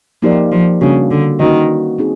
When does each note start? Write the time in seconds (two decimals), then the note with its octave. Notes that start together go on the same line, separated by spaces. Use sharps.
0.22 F3 A#3 D#4 G4 A#4 D5
0.52 F3
0.81 C#3 G3 A#3 D4 F#4
1.11 D3
1.39 D#3 A#3 C#4 F#4 B4 D#5
1.98 C4 D#4 G#4